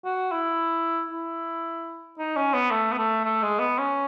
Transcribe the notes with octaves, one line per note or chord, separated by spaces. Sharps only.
F#4
E4
E4
D#4
C#4
B3
A3
B3
A3
A3
G#3
B3
C#4